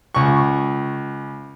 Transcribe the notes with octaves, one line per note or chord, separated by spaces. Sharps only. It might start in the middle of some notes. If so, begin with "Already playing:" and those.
C#2 C#6